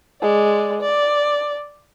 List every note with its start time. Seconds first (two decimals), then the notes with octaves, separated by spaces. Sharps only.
0.22 G#3 D5
0.80 D5